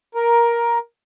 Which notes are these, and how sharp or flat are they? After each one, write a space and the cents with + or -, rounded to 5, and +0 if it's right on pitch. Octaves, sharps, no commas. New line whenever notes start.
A#4 +10